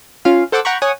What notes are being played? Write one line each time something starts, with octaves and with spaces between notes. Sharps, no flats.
C#4 F4 F5
A4 C5 F#5 A5 D6 E6
F#5 G5 A#5 B5 C#6
C#5 F#5 G#5 D#6